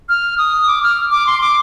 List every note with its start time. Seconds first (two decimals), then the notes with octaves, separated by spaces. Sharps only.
0.09 F6
0.38 D#6
0.67 D6
0.83 F6
1.11 D6
1.27 C6
1.41 D6